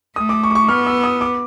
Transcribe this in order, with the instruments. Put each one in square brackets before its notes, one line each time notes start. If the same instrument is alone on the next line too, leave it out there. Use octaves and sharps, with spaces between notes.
[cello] A3 [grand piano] D#6
[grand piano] D6
C#6
D6
C#6
[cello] B3 [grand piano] F6
[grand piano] E6
D#6
D6